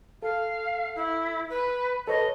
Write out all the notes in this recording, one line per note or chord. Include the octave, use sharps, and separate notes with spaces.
A4 F5
E4
B4
A4 B4 C#5 D#5